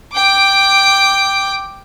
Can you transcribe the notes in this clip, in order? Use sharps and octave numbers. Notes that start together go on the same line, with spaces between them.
G5 D6